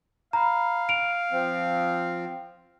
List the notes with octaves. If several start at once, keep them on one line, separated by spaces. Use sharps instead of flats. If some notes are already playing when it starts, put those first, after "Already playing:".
F5 A#5 B5
D7 F7
F3 C4